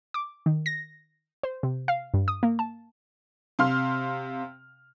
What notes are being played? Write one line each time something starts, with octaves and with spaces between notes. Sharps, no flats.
D6
D#3
A#6
C5
C3
F5
G2
D#6
A#3
A5
C3 F5 C6 F6